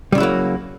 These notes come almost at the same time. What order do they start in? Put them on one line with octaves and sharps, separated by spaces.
G3 C#3 E4 F#3 A#3